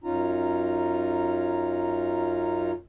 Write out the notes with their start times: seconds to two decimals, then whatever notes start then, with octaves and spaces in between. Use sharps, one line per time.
0.04 F#2 C#4 D#4 F4 A#5